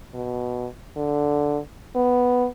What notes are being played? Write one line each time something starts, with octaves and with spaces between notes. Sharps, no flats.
B2
D3
B3